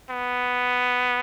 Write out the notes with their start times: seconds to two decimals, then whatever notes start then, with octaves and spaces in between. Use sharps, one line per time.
0.10 B3